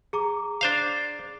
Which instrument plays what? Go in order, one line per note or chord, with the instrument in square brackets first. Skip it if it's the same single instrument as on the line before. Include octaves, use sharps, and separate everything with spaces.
[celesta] G#4 A#5 D6
[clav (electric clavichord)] D4 C5 F5